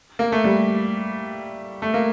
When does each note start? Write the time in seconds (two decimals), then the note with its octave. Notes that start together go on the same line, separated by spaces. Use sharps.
0.19 A#3
0.32 A3
0.44 G3
1.82 A3
1.94 A#3